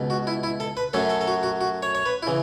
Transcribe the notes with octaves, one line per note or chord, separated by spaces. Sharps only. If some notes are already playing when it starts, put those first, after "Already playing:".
Already playing: C#2 B2 B3
F#4
E4
E4
A4
B4
F#2 F#3 A3 C#4 A4
A4
A4
F#4
F#4
F#4
C#5
C#5
B4
E4
C#3 E3